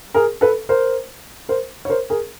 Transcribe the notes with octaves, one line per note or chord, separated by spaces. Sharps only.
G#4 A#4
A4 B4
A#4 C5
A#4 C5
C#5
A#4 C5
G#4 A#4